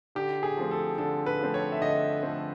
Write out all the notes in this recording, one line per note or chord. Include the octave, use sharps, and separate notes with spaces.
D3 G4
G#4
F3 A3 C4
A4
D3 A4
B4
F3 A3 C4
C#5
E5
D3 D#5
F3 A3 C4